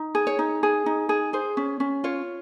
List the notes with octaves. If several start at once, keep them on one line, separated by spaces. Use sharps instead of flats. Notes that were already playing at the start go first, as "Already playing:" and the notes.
Already playing: D#4
G#4
C#5
D#4
G#4
D#4
G#4
G#4 C5
C#4
C#4
F4 C#5